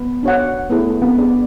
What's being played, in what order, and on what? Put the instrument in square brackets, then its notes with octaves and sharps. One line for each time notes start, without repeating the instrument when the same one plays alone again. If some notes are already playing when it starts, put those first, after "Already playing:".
Already playing: [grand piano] B3
[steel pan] D4 F#4 C#5 F#5
[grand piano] A3 [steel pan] B3 E4 G#4
[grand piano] A3
B3
[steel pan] D4 G#4 D5